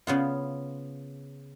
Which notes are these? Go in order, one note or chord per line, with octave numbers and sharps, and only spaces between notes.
C#3 B3 F4